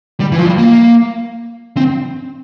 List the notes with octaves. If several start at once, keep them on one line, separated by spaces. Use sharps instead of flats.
G3
E3
F3
G3
A#3
C4